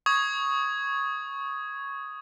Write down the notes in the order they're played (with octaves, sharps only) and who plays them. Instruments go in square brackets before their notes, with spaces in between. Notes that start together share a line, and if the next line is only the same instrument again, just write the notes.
[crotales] C#6 D#6 G#6